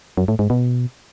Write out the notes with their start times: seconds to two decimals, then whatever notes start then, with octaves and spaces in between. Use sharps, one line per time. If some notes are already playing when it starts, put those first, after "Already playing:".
0.17 F#2
0.28 A2
0.39 G#2
0.50 B2